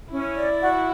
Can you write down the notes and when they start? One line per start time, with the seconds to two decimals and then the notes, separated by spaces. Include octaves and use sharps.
0.10 C#4 E4
0.34 D5
0.60 F#4